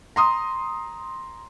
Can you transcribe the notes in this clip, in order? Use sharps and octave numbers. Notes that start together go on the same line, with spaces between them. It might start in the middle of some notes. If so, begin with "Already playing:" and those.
A#5 C6 D#6